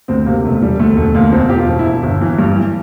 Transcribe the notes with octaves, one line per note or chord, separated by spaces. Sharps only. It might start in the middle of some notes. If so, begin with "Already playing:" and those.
D2 C4
C3 A#3
E1 A3
E1 G3
D2 A3
E1 A3
D2 A#3
E1 C4
E1 G4
F4
E1
E4
E1
G1
E3
G2 G3
E3